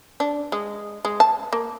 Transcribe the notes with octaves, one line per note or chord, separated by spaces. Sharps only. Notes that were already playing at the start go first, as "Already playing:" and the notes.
D4
G#3
G#3
A5
A#3